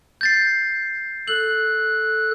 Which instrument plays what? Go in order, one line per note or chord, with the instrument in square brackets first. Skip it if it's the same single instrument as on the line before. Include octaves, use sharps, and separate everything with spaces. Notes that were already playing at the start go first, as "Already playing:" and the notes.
[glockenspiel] G6 A6 C7
[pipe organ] A4 F#6 [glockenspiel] F#7